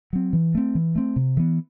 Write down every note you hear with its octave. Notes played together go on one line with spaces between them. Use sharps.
F#3 C4
E3
A3 C4
E3
A3 C4
C3
E3 B3